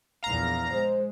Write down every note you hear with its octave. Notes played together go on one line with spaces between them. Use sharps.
A#1 E2 F5 A#5
G#3 C5